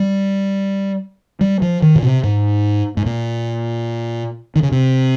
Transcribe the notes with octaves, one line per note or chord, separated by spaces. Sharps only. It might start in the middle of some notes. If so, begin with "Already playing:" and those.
Already playing: G3
G3
F3
D#3
A#2
C3
G#2
G#2
A#2
D#3
C#3
C3